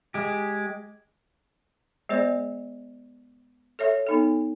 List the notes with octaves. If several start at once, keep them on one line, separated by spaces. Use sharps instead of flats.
G#3 G4
G#3 B3 G#4 C5 D5
A4 C#5 E5
B3 D#4 A4